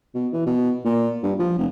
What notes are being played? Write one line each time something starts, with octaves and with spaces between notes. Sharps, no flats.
B2
E3
B2
A#2
G2
F3
F1